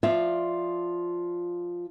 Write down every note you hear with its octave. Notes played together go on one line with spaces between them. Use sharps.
F3 F4 D5 E5